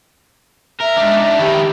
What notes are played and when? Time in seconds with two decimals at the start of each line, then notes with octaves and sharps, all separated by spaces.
0.81 A#4 E5
0.97 G#3 D4 D#4
1.39 D#3 E4 G4